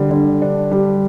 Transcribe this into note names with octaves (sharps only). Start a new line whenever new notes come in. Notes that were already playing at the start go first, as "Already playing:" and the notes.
Already playing: D3 G3
D3
D4
G3